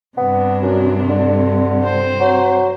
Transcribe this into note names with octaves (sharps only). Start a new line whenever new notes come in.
G2 C3 B3 D4
F#2
D3
C4 C5
F#3